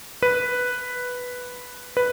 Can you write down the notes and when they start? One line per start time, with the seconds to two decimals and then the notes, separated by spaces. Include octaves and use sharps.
0.23 B4
1.97 B4